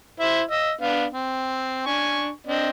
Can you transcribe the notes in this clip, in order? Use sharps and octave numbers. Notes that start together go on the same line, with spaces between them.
E4 C5 E5
D#5 E6
B3 D4 F5
C4
D4 G#5 C#6
C4 D4 D#5